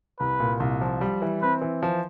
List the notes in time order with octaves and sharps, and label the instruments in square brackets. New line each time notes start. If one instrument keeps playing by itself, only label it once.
[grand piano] C2 [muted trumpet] B4
[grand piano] A#2
C2
F3
G3
E3
[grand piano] C4 [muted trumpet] B4
[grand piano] E3
F3